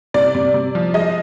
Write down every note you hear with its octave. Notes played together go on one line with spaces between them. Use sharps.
C3 D5
C3
C3
F3
G#3 D#5